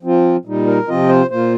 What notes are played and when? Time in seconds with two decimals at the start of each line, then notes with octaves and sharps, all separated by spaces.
0.03 F3 C4 F4
0.45 A#2 G3 D#4
0.67 A#4
0.88 C3 F3 C4 F4 D#5
1.09 C5
1.30 A#2 A#3 F4 C5